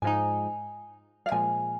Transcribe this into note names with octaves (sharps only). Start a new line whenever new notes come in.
G#2 F3 G#3 D#4 G#5
F5
A#2 F3 G#3 G#5